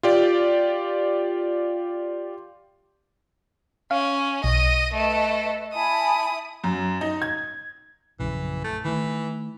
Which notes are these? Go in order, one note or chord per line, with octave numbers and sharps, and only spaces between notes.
F4 G4 D5
C#4 F5
B1 D#5 D#7
A3 A4 B4 D#5
E4 G#5 A5 B5 D#6
F#2
D#4
G#6
A#1 F#2 C#3 E3
A3
D#3 E3 A3